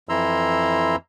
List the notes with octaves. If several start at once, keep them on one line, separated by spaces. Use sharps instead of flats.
F2 E3 E4 A#5 C6 E6